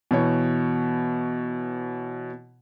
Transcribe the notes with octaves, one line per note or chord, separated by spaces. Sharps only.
B2 E3 C#5